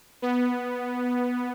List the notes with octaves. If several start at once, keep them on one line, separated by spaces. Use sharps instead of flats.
B3